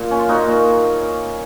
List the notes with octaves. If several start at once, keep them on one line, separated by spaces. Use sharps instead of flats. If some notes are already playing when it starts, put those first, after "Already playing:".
Already playing: A#2
C#4
F4
A#2 D#4 F#4
A#2